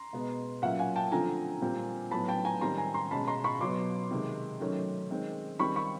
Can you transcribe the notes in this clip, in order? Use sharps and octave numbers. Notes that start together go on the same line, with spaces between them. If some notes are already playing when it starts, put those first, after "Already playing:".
Already playing: A#5 C6
B2 G#3 B3
A#2 F#3 A#3 C#4 E5 F#5
F#5 G#5
G5 A5
D3 F3 A3 C4 G#5 A#5
A#2 G3 C4
A2 F#3 B3 A5 B5
G5 A5
G#5 A#5
D#3 G3 C4 A#5 C6
G#5 A#5
A#5 C6
B2 G#3 C#4 A5 B5
A#5 C6
B5 C#6
B2 F#3 B3 C6 D6
C3 D#3 G#3
D#3 F#3 A3 C#4
D#3 G#3 C4
D#3 G3 C4 B5 C#6
B5 C#6